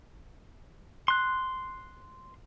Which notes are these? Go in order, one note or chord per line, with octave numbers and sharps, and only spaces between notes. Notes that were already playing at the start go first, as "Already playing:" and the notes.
C6 F#6